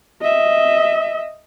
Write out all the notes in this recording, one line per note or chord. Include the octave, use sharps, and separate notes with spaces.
D#5 E5